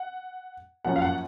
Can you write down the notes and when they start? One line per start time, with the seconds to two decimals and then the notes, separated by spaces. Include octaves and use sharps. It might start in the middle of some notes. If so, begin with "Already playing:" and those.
Already playing: F#5
0.84 F#2 F3 A#3 C#4 F#5
0.96 F5
1.02 F#5